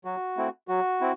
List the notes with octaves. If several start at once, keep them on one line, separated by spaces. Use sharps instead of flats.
F#3 F#4
A3 C4 E4
F#3 F#4
C4 E4